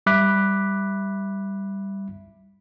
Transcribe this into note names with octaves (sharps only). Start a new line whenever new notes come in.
G3 E5 B5 D6 F#6 B6